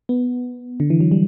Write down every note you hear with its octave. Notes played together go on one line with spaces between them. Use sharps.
B3
D3
E3
F#3
G3